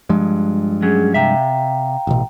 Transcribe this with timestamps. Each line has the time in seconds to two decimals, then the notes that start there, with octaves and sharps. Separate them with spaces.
0.09 G2 F3 G#3
0.82 F#3 C#4 G#4
1.14 C3 E5 F5 G5 A#5
2.07 A1 B2